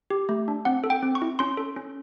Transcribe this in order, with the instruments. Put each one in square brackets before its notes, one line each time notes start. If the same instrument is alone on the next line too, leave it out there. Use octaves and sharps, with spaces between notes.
[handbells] G4
A3
D4
C4 F#5
A4
G5
C4
C#6
E4
C#4 C6
A4
C#4